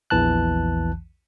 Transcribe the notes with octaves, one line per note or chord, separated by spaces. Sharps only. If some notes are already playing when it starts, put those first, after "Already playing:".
A#1 E2 E3 A5 F#6